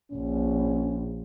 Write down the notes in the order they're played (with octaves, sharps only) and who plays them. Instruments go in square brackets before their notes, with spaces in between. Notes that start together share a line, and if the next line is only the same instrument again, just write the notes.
[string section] A#1 [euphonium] C#4